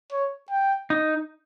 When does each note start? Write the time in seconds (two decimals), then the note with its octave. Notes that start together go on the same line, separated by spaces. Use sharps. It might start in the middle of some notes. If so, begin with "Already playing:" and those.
0.12 C#5
0.51 G5
0.90 D#4